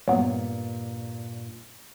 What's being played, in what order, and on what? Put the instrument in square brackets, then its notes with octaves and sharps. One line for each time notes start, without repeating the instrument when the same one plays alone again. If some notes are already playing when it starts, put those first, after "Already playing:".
[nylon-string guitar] G2 A#2 [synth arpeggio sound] F#3 B3